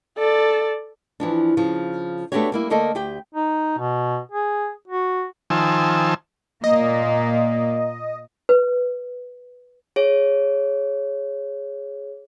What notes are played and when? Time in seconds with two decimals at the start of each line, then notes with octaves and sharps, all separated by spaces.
0.17 A4 D5
1.20 E3 F3 D4
1.57 C#3 F3
2.32 A3 B3 D4 F#4 G4 C#5
2.52 G3 A#3 E4
2.70 D3 A3 A#3 A4 D#5
2.95 D2 G4 G5
3.33 D#4
3.78 B2
4.31 G#4
4.88 F#4
5.50 D#3 F3 C5 G#5 A5 E6
6.64 A#2 A#3 D#5
8.49 B4
9.96 G#4 C#5